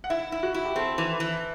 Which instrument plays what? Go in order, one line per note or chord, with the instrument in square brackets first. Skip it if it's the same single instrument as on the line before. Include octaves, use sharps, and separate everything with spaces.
[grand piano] F#5
[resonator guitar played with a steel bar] E4 [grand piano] E5
[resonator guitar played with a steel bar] E4
[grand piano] F#4
[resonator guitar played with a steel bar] E4
[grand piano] G4
[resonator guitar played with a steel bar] C4 [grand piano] A4
[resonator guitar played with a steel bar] E3
E3